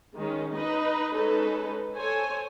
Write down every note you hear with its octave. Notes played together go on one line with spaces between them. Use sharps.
D#3 G#3 C#4
D#4 B4 D#5
G#3 C#4 D#4 A4 B4
A4 C5 C#5 G#5